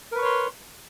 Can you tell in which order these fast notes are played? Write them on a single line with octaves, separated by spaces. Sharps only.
A#4 B4 C#6 C#5 C6